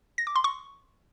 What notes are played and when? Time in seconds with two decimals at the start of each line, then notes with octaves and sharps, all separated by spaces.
0.18 A#6
0.27 D6
0.36 C6
0.44 C#6